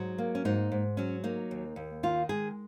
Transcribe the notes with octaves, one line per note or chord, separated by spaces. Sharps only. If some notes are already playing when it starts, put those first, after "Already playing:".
Already playing: G#2 F#3
A#3
C#4
G#2 D#4
G#2
F#3 C#4
A#3 D#4
D#2
D#2
D#3 F4
G#3 G#4